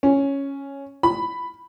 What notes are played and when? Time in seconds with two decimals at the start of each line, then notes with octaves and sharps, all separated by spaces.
0.03 C#4
1.03 B5